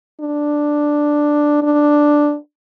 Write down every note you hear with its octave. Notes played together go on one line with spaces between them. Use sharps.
D4
D4